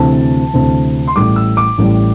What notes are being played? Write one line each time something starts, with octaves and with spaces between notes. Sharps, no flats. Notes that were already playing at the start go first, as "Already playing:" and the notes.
Already playing: D2 C3 E3 C4 A5
D2 C3 E3 C4
C6
A1 A2 G3 D6
E6
D6
A1 A2 G3